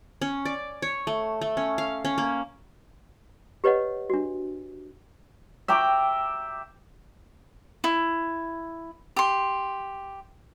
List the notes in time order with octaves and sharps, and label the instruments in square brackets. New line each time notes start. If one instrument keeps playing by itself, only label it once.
[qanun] C#4
D5
C#5
A3
A3
C#4
F5
C#4
A#3
[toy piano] G4 B4 C#5 D#5 F#5
D4 F#4
[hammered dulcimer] E5 G5 A#5 D6
[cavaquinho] E4
G4 C6